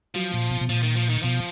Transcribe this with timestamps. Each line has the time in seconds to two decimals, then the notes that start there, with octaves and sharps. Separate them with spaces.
0.15 F3 F#3
0.34 A#2
0.51 B2
0.61 B2
0.69 A#2 F3
0.83 D#3
0.96 F3
1.09 D#3
1.23 B2 F3